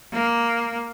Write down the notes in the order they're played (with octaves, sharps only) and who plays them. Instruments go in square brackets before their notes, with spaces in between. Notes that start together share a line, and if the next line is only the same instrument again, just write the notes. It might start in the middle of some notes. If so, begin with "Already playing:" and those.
[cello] A#3